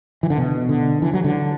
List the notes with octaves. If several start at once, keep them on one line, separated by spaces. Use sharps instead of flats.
E3
D3
B2
D3
E3
F#3
D3